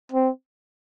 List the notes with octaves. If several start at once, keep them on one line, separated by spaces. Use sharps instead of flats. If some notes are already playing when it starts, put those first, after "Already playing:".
C4